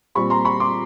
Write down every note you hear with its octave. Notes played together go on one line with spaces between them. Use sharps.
A#2 G3 C4 B5 C#6
A#5 C6
B5 C#6
C6 D6